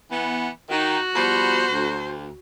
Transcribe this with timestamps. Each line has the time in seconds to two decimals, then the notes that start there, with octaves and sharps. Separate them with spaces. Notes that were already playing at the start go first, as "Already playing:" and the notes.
0.11 E3 B3
0.70 D#3 D#4 F#4
1.15 F3 G3 B3 C5
1.71 D2